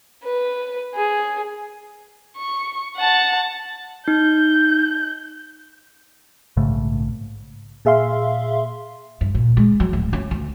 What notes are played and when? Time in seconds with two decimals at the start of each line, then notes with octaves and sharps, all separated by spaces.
0.24 B4
0.94 G#4
2.37 C#6
2.97 F#5 A5
4.08 D#4 G6
6.57 A#1 G#2 C#3 A3
7.85 A#2 G#4 E5 F5 C6
9.21 G2
9.35 A#2
9.57 G#3
9.80 F#3
9.93 D1
10.13 C#4
10.31 D2